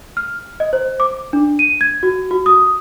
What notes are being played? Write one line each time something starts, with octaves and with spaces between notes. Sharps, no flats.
F6
D#5
C5
D6
D4
D#7
G#6
F#4
F#4
D#6